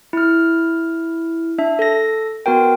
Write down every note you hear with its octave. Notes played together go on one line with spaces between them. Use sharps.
E4 F6
D4 E5
A4 A#6
B3 F#4 A#4 G5